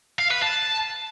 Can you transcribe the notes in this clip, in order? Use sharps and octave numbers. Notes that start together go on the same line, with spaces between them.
F5
B4
A5